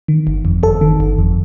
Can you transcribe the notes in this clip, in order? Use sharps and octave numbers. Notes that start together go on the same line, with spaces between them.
D#3
G1
F2
G1 A4
D#3
G1
F2